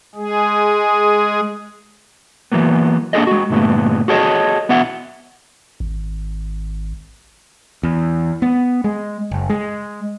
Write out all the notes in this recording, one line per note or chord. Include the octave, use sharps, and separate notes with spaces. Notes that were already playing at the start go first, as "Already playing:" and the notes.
G#3 G#4
E3 F#3 A#3 B3
A#3 D4 F4 G#4 A4 D#5
G#3 F#4
G2 A#2 D3 A3 B3
F#4 G#4 A4 C#5 D#5
B1 B3 F#4 E5 F#5
G#1
E2
B3
G#3
F#1
G#3